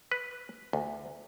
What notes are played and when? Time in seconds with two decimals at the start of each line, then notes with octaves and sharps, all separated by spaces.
0.11 B4
0.73 D2